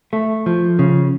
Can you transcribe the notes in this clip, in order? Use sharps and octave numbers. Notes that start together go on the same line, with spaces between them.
A3
F3
C#3